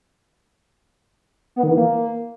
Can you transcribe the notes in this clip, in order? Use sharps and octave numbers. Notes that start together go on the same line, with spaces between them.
B3
D#3
E3
A#3